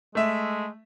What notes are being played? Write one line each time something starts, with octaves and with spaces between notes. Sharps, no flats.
G#3 A3 E5